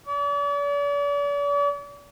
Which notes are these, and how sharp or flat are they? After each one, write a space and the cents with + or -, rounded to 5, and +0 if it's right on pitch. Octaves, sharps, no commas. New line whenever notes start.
D5 -45